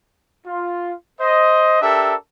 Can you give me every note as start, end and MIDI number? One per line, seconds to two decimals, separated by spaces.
0.46 0.93 65
1.21 1.79 72
1.21 1.79 75
1.82 2.15 62
1.82 2.15 67
1.82 2.15 69
1.82 2.15 70
1.82 2.15 76